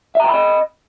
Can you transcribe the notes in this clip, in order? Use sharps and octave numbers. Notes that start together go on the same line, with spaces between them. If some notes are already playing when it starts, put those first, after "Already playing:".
D#5 E5 G5 A#5 B5